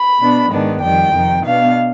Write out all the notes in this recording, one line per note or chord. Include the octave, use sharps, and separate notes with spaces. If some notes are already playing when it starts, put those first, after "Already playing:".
Already playing: B5
B2 B3 D4
G#2 D#3 B3 D4
F2 D#3 G3 G5
F2 C3 D#3
B2 B3 D4 F5